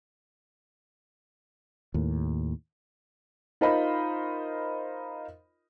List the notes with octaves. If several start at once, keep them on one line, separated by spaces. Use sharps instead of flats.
D#2 A2
D#4 F4 A#4 C5 D#5 B5